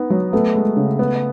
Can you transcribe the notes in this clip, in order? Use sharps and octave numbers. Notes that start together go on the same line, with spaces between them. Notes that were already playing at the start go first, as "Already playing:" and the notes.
Already playing: B3 D#4
F#3
A3 B3
G#3
C#3
B3